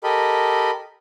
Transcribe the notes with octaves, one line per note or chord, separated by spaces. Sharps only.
G4 A4 A#4 D#5 B5